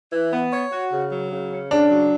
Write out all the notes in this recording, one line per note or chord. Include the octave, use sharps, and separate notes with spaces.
E3
B3
C#5
F#4
C#3
F#3
C#3
C#4
C#3 D4
F#3